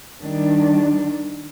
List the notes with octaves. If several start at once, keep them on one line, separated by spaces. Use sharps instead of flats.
D#3 G3 D4